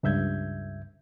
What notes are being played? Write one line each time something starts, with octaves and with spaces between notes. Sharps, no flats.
C#2 G2 E5 G6 G#6